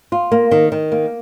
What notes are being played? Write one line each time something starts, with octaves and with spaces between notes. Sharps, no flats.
F4
A#3
D#3
D#3
A#3